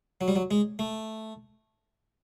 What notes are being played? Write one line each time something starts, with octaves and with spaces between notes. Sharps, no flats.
F#3
G3
F#3
G#3
A3